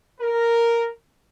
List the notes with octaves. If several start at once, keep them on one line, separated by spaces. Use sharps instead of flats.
A#4